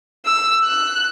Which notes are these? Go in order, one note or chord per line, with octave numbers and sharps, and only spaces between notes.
E6
F#6